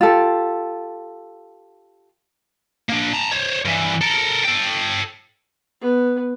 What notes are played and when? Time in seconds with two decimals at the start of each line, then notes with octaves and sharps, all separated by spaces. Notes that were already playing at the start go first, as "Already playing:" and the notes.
0.01 F4 G4 A4
2.90 A#3 D4
3.13 A5 A#5
3.31 C5 C#5
3.65 G2 E3
4.01 A4 A#4
4.45 A4 G5
5.81 B3